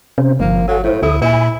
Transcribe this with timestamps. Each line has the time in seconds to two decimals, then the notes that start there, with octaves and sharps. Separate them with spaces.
0.18 C3 C#4 C5
0.40 G1 F3 A#3
0.68 F#3 A4 F5 G#5
0.84 A2 E4 C5
1.03 D2 E4 A4 D#6
1.22 A#2 E4 G#5 B5